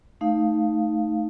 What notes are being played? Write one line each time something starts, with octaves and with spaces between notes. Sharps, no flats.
A3 D#4 F5